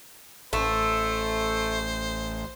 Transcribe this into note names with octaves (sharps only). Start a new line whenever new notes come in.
A1 A3 C5